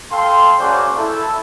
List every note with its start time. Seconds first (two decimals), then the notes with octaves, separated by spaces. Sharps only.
0.12 A4 F5 G5 C6
0.59 A#3 C#4 F#4 G#4 C5 D5
0.98 E4 A4